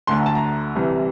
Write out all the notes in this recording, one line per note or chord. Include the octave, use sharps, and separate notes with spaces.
D2 D3 A3 C6
A#5
A5
A#5
C2 C3 E3 G3